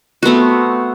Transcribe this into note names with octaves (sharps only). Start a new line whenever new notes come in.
A3 B3 C4 F#4